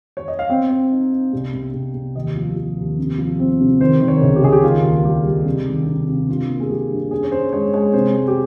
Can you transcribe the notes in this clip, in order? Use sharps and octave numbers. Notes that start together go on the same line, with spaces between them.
C#5
D#5
F5
C4 G5
C4
D#4
D#4
C2
C2
C2
C2
D#2 D#5
F3
F3
D#2
C3
F3
C4
C3
D#3 C5
D#3
C#5
C#2
G4
C#2 G#4
G4
D#3 F4
D#2
G3 G4
G3
C3
D#3
C3
C3
G2 F4
A#3
G#4
G3 G4
G2
C#4 G#4
C#5
C#4 C5
G#3 C#5
G#3 C#5
C3 C5
G#3
G4